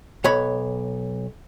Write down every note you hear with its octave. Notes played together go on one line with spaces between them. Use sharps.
B1 C#5 B5